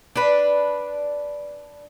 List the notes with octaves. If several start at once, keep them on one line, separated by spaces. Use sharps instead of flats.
D4 B4